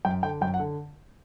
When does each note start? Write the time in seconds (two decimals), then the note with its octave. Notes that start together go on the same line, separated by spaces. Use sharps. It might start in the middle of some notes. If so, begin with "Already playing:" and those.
0.05 F#2 G5
0.23 D3 G5
0.41 F#2 G5
0.54 F#5
0.60 D3